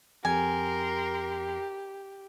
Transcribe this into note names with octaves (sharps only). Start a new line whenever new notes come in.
F2 G4 A#4 G#5 C6